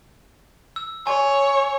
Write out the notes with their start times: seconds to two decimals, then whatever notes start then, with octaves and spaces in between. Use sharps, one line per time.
0.76 E6
1.07 C#5 G#5